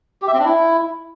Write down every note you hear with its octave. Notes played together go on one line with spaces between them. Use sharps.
G4
E5
C4
D4
E4